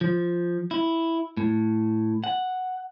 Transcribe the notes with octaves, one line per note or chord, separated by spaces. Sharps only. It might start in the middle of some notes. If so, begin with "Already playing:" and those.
F3
E4
A2
F#5